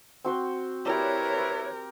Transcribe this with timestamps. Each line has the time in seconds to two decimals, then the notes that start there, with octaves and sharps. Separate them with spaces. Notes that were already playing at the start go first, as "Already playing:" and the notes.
0.24 C4 F#4 C5
0.86 E4 G4 A#4 B4 C#5 D5